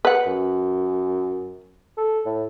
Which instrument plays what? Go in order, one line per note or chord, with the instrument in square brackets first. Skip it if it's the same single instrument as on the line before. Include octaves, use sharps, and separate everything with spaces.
[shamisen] B4 F#5
[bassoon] F#2
A4
A2